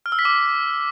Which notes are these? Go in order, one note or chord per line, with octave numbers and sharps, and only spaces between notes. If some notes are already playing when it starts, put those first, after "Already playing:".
F6
E6
B6
D6